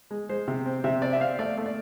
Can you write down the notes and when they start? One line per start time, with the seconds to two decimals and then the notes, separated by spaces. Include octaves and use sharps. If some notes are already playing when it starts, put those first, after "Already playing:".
0.11 G#3
0.29 G#3 C5
0.48 C3
0.66 C4
0.84 C3 E5
1.02 C4 D5
1.13 E5
1.20 C4 F5
1.39 A3 D5
1.58 A3
1.66 D5